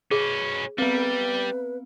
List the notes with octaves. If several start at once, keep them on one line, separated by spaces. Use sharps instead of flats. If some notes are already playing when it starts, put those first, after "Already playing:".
B2 C#4 G#4
G3 B3 C4 B4